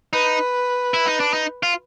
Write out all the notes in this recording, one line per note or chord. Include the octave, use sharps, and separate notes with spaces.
D#4 B4
E4
D#4
D4
D#4
F4